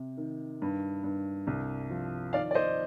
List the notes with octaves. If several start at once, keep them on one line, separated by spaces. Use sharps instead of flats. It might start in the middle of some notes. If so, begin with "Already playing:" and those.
Already playing: C3
D#3
G2
G2
C2
F3
D#3 D5 F5
D5
C5 D#5